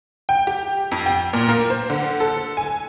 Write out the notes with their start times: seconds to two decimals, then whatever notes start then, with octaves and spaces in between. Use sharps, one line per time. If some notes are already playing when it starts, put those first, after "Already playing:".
0.29 G5
0.47 G4
0.91 F2
1.06 G5
1.33 A#2
1.49 A#3
1.70 C5
1.90 D3
2.20 A4
2.57 G#5